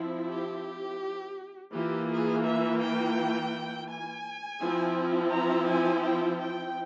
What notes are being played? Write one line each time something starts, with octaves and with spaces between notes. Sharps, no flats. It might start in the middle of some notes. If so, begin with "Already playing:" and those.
Already playing: F3 C4 E4
G4
E3 A#3 F4 G4
G#4
E5
G5
G#5
F3 C4 E4
A#5
G#5
G5
G5